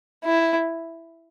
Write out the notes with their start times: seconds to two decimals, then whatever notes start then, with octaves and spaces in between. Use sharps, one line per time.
0.24 E4